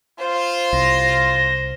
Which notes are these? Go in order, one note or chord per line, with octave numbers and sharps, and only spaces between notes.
F4 C5
C2 A#6